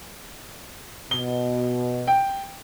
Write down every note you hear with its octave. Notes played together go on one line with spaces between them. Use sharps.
B2 G7
G5